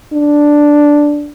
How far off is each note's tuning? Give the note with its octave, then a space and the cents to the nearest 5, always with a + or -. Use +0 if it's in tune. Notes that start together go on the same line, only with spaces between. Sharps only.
D4 +0